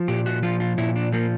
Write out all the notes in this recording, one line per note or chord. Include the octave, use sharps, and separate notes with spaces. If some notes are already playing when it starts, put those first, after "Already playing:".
Already playing: F3
A#2 G4
F#4
F3 F4
F4
A#2 E4
D4
F3 A#3